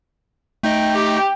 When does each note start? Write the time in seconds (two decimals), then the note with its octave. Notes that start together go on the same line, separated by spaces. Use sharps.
0.63 A3 D#4 D#5 G5
0.95 G4